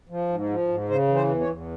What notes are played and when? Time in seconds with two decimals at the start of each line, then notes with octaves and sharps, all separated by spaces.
0.09 F3
0.29 G#2
0.49 F3
0.68 G#2
0.89 C#3 C5
1.08 E3
1.15 C5
1.28 E2
1.41 C#5
1.48 E2